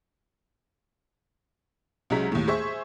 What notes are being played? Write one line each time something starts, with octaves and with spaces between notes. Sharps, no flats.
C2 F#3 G#3 C#4 A#5 B6
D#2 A2
G#4 C5 E5 C#6